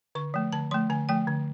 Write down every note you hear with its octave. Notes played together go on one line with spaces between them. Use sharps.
D3 C#6
F3 A3
D3 A5
F3 A3 C6
D3 G#5
F3 A3 G5
D3